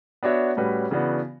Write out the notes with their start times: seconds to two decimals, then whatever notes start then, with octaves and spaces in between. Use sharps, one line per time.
0.23 B3 D4 F#4 C#5 E5
0.57 A2 G3 C#4 F#4 B4
0.91 C#3 E3 B3 D4 F#4